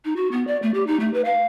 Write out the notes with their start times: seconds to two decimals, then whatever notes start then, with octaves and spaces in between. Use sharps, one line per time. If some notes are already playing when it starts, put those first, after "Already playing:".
0.05 D#4
0.16 F#4
0.32 B3
0.47 D5
0.62 A3
0.74 G4
0.87 D#4
1.00 A3
1.14 B4
1.25 F5